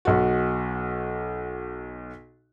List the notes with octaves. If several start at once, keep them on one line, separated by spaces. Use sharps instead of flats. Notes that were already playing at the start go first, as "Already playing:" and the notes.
B1 F#4